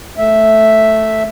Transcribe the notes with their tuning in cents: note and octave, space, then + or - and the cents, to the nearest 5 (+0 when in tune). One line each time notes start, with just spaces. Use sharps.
A3 +0 E5 +0